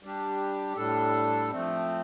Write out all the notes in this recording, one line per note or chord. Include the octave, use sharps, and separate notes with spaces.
G3 D4 G4
A2 G3 D4 A4
F3 A3 C4